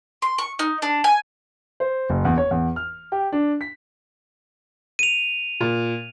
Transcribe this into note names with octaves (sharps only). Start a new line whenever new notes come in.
C6
C#6
D#4
D4
G#5
C5
F#1
E2
C#5
E2
F6
G4
D4
B6
D#7 F7
A#2